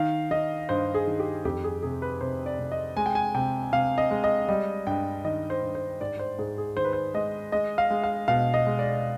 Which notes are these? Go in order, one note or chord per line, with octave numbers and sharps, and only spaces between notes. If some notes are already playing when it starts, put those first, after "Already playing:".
Already playing: D#3 F5
D#3 D#5
G2 C5
G#4
D#3
G4
F2 G4
G#4
C3 G#4
B4
C3 C5
D5
C3
D#5
G#3 G#5
G5
G#5
C3 G5
C3 F5
D#5
G#3
D#5
G3 D#5
G2 G5
D#3 D#5
C5
G2
C5
G#2 D5
C5
G#2 G#4
G#4
D#3 C5
B4
C5
G#3 D#5
G#3 D#5
F5
G#3
F5
B2 F5
D#5
G#3
D5